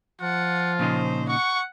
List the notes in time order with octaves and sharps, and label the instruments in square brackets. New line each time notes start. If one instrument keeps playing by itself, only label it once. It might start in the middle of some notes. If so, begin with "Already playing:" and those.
[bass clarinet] F3 [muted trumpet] F4 [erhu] F#5
[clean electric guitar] A#2 C#3 D#4 [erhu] C5
[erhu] F#5 [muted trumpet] C#6